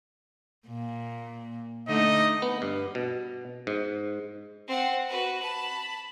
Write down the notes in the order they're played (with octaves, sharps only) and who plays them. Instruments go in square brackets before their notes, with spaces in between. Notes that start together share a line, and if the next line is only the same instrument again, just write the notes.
[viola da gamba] A#2
[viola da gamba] D3 A3 D#4 [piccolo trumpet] D#5
[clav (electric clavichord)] B3
G2
B2
G#2
[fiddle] C4 F#5
F#4 B4
A5 B5